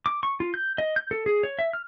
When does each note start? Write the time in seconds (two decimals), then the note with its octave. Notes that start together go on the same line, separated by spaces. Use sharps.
0.06 D6
0.23 C#6
0.40 F4
0.54 G6
0.78 D#5
0.96 G6
1.11 A4
1.26 G#4
1.43 C#5
1.59 E5
1.73 F6